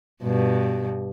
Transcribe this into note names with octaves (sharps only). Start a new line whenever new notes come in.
G2 B2